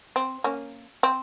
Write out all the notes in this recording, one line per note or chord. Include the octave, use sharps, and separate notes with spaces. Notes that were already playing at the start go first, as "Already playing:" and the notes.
C4
A#3 C#4
C4